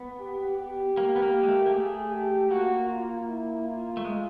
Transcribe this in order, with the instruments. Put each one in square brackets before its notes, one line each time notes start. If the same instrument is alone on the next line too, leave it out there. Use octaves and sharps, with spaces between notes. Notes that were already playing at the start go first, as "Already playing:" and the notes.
Already playing: [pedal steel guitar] B3
[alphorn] G4
G4
[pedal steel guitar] A#3
B3
A#3
G#3
A3
A#3
[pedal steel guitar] A3 [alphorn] G#4
[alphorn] G4
[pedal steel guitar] A#3 [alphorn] F#4
[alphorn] F4
E4
F4
[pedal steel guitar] A3
G#3